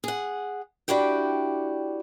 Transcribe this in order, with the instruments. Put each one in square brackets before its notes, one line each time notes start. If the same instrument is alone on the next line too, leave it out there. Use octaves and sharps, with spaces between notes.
[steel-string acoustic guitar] G#4 F#5
D4 E4 F#4 G4 G5